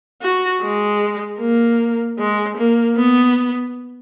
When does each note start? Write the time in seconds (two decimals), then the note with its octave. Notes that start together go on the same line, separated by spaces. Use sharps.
0.22 F#4
0.62 G#3
1.40 A#3
2.18 G#3
2.58 A#3
2.97 B3